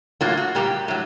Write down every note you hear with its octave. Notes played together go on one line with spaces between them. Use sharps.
A2 F#3 A#3 F4
F#4
A#2 G3 A#3 G4
A2 F#3